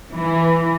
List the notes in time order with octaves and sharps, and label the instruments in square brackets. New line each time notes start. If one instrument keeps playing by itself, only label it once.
[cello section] E3